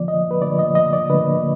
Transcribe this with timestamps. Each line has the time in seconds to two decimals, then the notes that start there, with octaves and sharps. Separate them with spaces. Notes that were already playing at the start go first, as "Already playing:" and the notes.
Already playing: D3 F3 A#3 D5
0.08 D#5
0.31 B4
0.42 D3 F3 A#3 D5
0.59 D#5
0.75 D#5
0.93 D5
1.10 D3 F3 A#3 B4